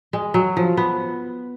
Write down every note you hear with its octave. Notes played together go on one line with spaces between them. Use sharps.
G#3
F#3
F3
B3